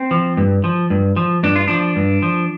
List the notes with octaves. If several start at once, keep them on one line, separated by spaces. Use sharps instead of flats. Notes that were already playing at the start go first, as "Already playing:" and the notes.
Already playing: C4
F3
G2
F3
G2
F3
G2 D4
F4
F3 D4
G2
F3